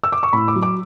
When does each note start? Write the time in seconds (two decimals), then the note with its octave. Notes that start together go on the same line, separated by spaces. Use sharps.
0.04 E6
0.12 D6
0.23 C#6
0.33 A2 B5
0.48 D6
0.56 F#3
0.62 D6